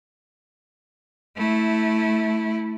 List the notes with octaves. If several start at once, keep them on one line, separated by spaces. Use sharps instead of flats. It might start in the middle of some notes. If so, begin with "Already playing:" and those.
A3 E4